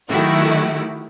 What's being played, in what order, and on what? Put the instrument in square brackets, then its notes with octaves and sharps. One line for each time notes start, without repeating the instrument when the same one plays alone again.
[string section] D#3 F#3 A3 E4 F#4 G4